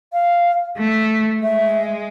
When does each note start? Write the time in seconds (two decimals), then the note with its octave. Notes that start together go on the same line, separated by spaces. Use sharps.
0.13 F5
0.78 A3
1.42 G#3 E5